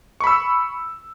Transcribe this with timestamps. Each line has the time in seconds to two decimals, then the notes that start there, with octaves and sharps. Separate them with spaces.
0.20 C#6
0.24 B5
0.27 E6